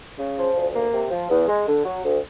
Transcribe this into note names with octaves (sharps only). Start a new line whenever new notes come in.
C#3
F3
D2
A#3
C3
F3
E2
G#3
D3
F#3
D2